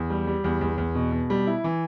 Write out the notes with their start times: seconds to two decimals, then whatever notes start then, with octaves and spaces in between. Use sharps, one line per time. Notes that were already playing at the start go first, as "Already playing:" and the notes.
Already playing: E2
0.10 G3
0.27 G3
0.44 E2
0.61 E2
0.78 E2
0.95 B2
1.12 B2
1.30 G3
1.47 E4
1.64 E3